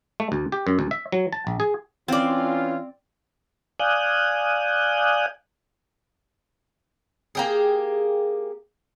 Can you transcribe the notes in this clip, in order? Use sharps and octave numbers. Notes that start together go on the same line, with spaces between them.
A3
D2
G4
F#2
D2
E5
F#3
A5
A#1
G#4
E3 C4 C#4 F4 D5
D5 F5 G#5 D#6 F#6 G6
A#3 G4 G#4